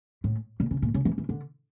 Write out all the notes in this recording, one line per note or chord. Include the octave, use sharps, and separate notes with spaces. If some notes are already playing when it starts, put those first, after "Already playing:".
A2
A#2
C#3
A#2
C#3
E3
E3
D3